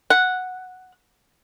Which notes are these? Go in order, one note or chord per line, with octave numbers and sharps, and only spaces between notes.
F#5